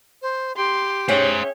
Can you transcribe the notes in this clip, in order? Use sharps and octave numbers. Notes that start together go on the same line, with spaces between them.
C5
G4 C6
C#4 G#4 C5 C#5 E5 F#5 G5